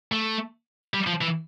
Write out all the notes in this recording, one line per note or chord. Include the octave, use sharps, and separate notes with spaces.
A3
G3
F3
E3